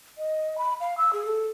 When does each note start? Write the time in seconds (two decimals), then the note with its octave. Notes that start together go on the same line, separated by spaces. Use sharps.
0.18 D#5
0.58 B5
0.80 F5
0.98 E6
1.13 G#4
1.26 A4